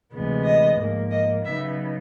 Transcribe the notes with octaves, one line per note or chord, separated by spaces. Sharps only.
D2 C3 E3 G#3 B3
D#5
G#2 F3 A#3
D#5
C#3 F#3 B3 D#4 E5